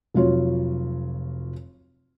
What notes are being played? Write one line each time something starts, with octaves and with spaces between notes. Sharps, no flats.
F1 F#3 F4 C#5